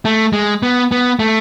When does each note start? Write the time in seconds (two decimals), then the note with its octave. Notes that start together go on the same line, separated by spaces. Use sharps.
0.05 A3
0.33 G#3
0.63 B3
0.92 B3
1.19 A3